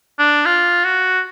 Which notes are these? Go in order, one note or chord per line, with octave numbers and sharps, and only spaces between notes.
D4
F4
F#4